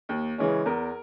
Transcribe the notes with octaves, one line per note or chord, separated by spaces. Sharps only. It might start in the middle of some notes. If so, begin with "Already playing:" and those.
D#2
C#3 E3 G#3 C#4
E2 A#4